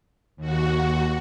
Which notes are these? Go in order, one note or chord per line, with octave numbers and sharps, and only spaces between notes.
D#2 F#4